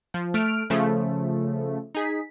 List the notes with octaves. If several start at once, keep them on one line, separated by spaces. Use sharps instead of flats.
F3
A3 F6 D7
C#3 F3 A3
D#4 G#4 B6